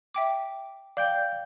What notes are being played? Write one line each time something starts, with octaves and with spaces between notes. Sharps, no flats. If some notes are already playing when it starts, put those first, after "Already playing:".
E5 G5 D6
D5 F5 G5 G6